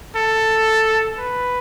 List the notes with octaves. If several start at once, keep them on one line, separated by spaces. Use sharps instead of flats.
A4
B4